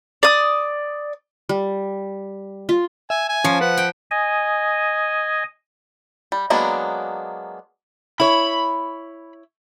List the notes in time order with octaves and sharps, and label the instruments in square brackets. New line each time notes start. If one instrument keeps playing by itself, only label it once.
[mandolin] D5 D#6
[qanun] G3
F4
[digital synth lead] E5 [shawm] G#5
[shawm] G#5
[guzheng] F3 [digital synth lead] C#4
[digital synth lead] B4 [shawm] F#5
[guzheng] G5
[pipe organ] D#5 G#5
[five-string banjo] G3
F#3 G#3 A#3 B3 D4
[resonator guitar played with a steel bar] E4 C#5 [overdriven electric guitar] B5